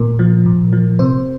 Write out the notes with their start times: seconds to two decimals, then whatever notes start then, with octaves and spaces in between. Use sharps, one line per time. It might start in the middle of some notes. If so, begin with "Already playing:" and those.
Already playing: A#2 A#4
0.19 F3
0.46 A#2
0.73 F3
0.99 C3 C5